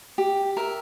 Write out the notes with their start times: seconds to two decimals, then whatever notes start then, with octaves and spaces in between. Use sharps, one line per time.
0.18 G4
0.57 A#4 E5